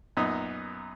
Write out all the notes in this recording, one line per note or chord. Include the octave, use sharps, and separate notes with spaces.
F#2 A#2 B3 D#4 D#5